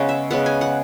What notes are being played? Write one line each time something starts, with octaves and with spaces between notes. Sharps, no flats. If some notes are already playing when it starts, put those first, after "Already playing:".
Already playing: C#3 G#3 B3 F#5
E5
C#3 G#3 B3 F#5
G#5
F#5